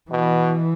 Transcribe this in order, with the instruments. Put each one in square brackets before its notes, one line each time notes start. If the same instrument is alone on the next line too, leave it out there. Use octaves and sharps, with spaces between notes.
[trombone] B2 [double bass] E3